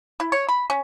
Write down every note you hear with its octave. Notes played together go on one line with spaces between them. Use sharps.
E4
C#5
B5
C#4